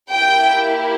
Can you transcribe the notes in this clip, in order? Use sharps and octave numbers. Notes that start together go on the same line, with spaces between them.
A#3 E4 G4 G5